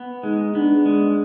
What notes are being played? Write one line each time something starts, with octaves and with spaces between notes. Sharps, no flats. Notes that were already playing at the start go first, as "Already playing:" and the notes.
Already playing: B3
G#3 D#4
B3 D4
G#3